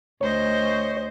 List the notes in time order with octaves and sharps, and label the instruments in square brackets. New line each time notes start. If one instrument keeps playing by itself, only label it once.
[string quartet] D2 C5 D#5 [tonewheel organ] C#5